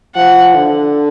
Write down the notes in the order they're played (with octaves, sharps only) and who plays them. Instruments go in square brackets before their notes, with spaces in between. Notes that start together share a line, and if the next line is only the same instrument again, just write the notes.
[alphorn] F3 [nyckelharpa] F#5
[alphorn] D3